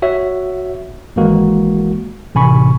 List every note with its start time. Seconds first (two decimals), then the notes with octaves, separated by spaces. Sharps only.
0.02 F#4 C#5 E5
1.16 G#1 E3 G#3 A#3 F#4
2.35 A1 C3 G#5 B5 C#6